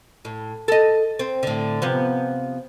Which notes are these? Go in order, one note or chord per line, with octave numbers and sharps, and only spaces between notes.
A2
A4 D#5
C4
A2 D3
C3 F3 B3